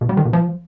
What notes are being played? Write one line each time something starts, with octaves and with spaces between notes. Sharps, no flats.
B2
G3
D#3
B2
F3